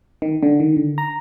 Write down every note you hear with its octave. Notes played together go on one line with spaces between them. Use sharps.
D#3
D3
D#3
D3
A#5